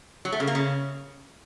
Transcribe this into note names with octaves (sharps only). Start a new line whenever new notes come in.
F#3
A3
C#3
A#3
C#3